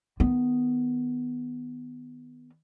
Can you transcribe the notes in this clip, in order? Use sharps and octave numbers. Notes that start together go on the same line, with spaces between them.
D#3 B3